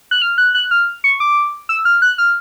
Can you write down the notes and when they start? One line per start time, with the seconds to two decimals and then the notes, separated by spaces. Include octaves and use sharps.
0.11 F#6
0.22 F6
0.38 F#6
0.55 F#6
0.71 F6
1.04 C#6
1.20 D6
1.69 E6
1.85 F6
2.02 F#6
2.18 F6